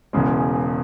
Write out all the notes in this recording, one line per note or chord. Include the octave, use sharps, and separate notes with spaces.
E1 E2 C#3 G#3